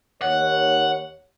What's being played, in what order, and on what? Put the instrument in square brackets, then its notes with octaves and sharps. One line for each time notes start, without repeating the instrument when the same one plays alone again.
[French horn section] D#2 C#5 [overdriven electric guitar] F#5